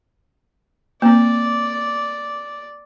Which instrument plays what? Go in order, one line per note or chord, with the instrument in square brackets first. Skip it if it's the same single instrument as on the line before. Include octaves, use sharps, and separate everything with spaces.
[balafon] A#3 C4 [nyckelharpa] D5